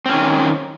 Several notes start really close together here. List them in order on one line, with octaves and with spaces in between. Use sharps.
C4 C#4 D#3